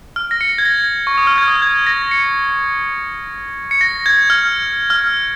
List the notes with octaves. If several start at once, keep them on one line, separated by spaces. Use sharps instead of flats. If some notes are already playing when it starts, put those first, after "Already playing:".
F6
A#6
C#7
G#6
A#6
C#6
D#6
F6
G#6
D#6
F6
G#6
A#6
C#7
C#7
A#6
G#6
F6
F6